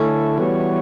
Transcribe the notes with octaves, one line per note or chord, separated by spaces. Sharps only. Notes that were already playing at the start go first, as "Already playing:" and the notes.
Already playing: D3 A3 C#4 E4 A4
E3 G3 B3 F#4 C#5